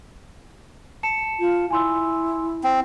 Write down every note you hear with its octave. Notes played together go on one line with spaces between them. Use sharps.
A5 C#7 E7
F4
E4 G#5 C6 E6
C4